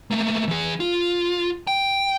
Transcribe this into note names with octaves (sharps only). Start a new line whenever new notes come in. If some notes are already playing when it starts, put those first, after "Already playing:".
A3 A#3
E3 G#4
F4
G5